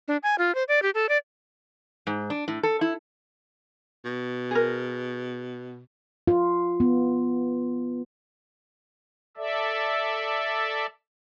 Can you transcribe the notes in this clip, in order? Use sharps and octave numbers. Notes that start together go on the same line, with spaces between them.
D4
G#5
F4
C5
D5
G4
A4
D5
G#2
D4
A2
A4
E4
B2
G#4 A#4
F4
B3
A4 D5 E5